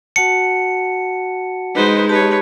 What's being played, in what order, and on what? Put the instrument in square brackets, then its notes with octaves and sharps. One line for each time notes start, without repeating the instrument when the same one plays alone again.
[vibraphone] F#4 F#5 A5 [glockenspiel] C#7
[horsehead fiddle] G#3 D#4 [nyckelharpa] B4 C5
[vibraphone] G4 A5 [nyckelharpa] B4 C#5